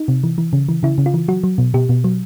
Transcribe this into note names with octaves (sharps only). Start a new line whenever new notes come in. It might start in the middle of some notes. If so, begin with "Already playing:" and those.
Already playing: D#4
C3
E3
E3
C#3
E3
C#3 E4
C#3
F4
E3
F#3 F#4
F#3
B2
B2 G4
B2
F#3